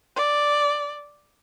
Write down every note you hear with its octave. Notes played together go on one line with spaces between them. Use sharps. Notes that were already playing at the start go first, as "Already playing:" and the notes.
D5